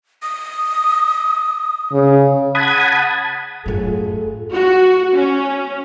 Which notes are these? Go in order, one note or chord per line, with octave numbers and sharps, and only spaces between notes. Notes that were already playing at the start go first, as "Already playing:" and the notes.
D#6
C#3
F#5 A5 B5 D#6 G#6
F#2 A2 F4 G#4 A4
F#4
C#4